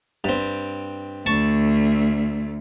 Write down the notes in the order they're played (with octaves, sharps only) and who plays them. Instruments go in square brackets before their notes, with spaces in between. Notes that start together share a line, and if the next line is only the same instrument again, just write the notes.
[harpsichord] G2 C4
[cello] D2 A3 [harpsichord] A5 C#6